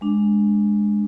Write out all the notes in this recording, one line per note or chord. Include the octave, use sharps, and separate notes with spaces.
G#3 D4